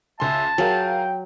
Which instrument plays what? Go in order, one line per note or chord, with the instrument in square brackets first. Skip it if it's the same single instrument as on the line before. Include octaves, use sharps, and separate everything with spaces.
[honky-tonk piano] C#2 C6 [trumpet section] E5 G#5 [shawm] A5
[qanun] F#3 [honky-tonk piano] G#4 A#4 F5 [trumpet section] G5